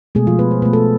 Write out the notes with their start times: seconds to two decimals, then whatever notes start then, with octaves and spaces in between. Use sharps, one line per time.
0.15 B2 G#3 A3 G#4
0.27 F3 F4
0.39 B3 B4
0.51 C5
0.62 B2 A3 B4
0.73 A4